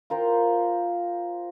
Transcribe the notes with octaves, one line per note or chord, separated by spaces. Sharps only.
F4 A#4 C5 G5